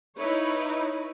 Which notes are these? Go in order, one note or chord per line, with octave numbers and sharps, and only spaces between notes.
D#4 E4 B4 C#5